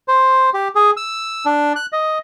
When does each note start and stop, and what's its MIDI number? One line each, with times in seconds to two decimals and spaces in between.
0.08 0.50 72
0.54 0.68 67
0.75 0.91 68
0.97 1.45 88
1.46 1.73 62
1.76 1.86 90
1.92 2.18 75